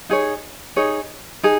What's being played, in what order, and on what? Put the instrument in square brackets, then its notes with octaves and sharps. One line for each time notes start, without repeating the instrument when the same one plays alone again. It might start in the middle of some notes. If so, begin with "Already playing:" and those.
[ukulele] D#4 G#4 C#5
D#4 G#4 C#5
D#4 G#4